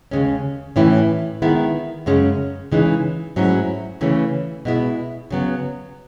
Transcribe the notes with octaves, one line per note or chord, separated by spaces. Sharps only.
D#2 C#3 G#3 C#4
A2 E3 A3 C#4 E4
D#3 G#3 B3 E4
F#2 C#3 G#3 C#4
C#3 E3 G#3 D#4
G#2 F#3 A3 C#4 E4
C#3 E3 A3 C#4
B2 G#3 B3 E4
C#3 F#3 B3